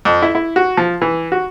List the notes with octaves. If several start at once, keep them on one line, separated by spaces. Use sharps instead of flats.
F2
E4
E4
F#4
F3
E3
F#4